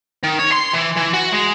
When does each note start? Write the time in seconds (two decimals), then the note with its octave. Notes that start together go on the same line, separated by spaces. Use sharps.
0.23 D#3
0.39 C#5
0.52 C6
0.73 E3
0.96 E3
1.13 F#4
1.32 G#3